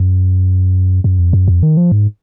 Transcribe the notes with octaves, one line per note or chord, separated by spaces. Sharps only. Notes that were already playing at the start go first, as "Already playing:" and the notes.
Already playing: F#2
F#2
F2
F#2
F2
D#3
F3
G#2